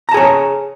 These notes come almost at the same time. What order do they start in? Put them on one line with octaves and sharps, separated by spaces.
A#5 A5 G#4 C#5